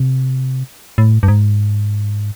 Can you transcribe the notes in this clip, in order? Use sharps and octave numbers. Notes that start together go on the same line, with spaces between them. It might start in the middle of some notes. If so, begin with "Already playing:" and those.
Already playing: C3
A2
G2
G#2